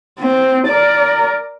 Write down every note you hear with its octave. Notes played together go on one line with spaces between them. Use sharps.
C4
A#4 D5